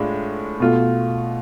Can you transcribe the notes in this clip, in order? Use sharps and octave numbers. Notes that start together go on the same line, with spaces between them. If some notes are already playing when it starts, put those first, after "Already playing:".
Already playing: A2 G#3 D4 F4
B2 A3 F4